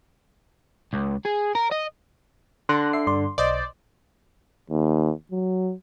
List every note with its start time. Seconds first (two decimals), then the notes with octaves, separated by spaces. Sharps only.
0.93 C#2
1.25 G#4
1.55 A#4
1.72 D#5
2.69 D3 C6 F#6 A#6
2.93 E5 C7
3.07 G2 D5 C6
3.38 B1 C5 D5 D#5
4.70 D#2
5.31 F#3